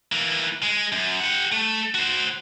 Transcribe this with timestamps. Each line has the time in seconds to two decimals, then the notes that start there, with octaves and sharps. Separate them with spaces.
0.12 E3 A#3
0.63 G#3
0.92 F#2
1.20 G4 F#5
1.52 A3
1.95 F#4 C5